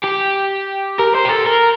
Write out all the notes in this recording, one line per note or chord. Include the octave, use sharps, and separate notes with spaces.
G4
A#4
C5
G4
A4
A#4